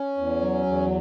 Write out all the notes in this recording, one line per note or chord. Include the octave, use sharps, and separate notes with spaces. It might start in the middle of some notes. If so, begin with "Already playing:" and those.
Already playing: C#4
E2
F#3
E2